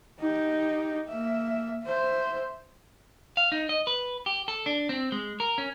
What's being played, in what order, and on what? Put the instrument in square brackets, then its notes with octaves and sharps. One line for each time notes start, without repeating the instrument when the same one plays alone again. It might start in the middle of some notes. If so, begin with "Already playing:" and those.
[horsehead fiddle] D#4 G4
A#3 E5
C5 E5
[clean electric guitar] F5
D#4
D#5
B4
G4
A4
D4
C4
G#3
A#4
C#4